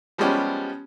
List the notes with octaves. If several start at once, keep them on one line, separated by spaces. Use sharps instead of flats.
F3 G3 G#3 B3 C#4 G4